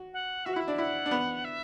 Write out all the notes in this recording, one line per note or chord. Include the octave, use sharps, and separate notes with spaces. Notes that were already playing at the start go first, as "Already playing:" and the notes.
Already playing: F#4
F#5
F#4 E5
F#5
E4
E5
D4
E4 F#5
D4
B3
E5